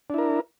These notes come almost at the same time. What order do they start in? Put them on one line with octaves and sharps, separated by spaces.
D4 E4 A#4